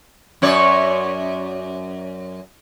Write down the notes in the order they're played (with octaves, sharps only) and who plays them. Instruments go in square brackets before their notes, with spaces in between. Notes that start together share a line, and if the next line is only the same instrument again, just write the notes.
[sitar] F#2 C#5 D5